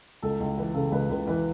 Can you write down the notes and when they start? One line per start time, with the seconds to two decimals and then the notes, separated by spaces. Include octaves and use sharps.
0.22 C#2 A4
0.40 C#2
0.58 E3 B4
0.74 C#3 A4
0.92 C#2 B4
1.09 C#2 B4
1.27 E3 B4